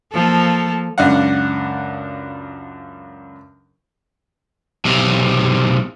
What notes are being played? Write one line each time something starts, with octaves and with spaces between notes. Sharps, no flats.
F3 A#3 A4
C#2 F#2 D4 F5 F#5
B1 C3